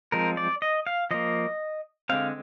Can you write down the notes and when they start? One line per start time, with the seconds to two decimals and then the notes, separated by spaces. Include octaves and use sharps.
0.12 F3 G#3 C4 A#4
0.37 D5
0.62 D#5
0.87 F5
1.11 F3 A#3 D#5
2.09 D3 G#3 C4 F5